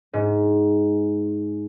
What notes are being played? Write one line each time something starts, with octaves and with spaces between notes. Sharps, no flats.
G#2